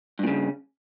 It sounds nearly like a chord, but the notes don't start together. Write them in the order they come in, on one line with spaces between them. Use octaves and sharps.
G2 A#2 C#3